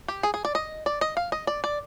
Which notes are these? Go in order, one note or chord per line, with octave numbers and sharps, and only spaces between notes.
G4
G#4
G#4
D5
D#5
D5
D#5
F5
D#5
D5
D5